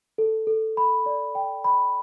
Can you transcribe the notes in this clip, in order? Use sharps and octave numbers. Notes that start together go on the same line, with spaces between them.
A4
A4
B5
D5
G5
B5